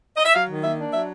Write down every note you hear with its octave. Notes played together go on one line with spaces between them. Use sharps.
D#5
E5
F#3 F5
D#3
A#3 E5
D4
F#3 E5